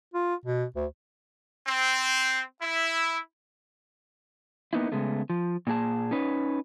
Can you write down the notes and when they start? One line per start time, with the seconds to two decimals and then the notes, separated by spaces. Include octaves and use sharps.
0.14 F4
0.45 B2
0.76 D2
1.67 C4
2.61 E4
4.73 A#3 B3 D#4 E4
4.92 C#3 G#3 A3 B3
5.30 F3
5.67 A#2 A#3 G#4 A5
6.11 C#4 D#4 B4 C#5